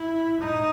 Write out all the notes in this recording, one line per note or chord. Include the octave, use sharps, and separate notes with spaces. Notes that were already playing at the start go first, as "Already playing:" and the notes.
Already playing: E4
D#4